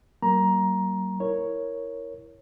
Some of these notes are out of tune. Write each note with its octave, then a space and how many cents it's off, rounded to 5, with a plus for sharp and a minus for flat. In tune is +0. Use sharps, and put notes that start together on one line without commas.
F#3 +45 A#3 +0 A#5 +15
E4 +0 A#4 +0 C#5 +0